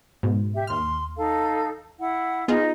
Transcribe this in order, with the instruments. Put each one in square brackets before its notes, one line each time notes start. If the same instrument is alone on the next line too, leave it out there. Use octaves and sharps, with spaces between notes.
[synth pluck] G#2 B2
[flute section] G4 E5
[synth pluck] D#2 F6 [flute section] C6
[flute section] D#4 A4 F5
E4 F#5
[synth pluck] B3 F4 G#4 [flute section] D#4 D#5